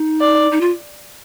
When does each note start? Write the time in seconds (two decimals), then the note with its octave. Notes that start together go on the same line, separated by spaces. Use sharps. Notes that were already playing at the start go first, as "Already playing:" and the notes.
Already playing: D#4
0.20 D5
0.52 D#4
0.61 F4